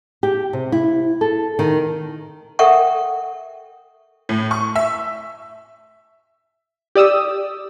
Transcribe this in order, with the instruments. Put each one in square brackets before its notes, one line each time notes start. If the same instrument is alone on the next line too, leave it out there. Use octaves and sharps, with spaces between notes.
[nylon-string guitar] G4
C3
E4
A4
D#3
[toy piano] A4 A#4 E5 F#5 G5 C#6
[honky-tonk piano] A2
C#6
E5
[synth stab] G4 D5 D#6 E6